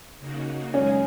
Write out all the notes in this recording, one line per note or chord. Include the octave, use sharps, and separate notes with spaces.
C#3 A#3 D#4 F#4
F#2 C#3 G#3 C#4 D#4 G#4